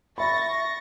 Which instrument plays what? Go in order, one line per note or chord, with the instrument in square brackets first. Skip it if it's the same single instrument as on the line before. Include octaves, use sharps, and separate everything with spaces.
[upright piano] E5 B5 [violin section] C#6 A6 A#6